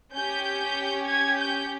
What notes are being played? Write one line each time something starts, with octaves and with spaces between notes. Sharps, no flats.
C#4 G4 G6
G#6
G6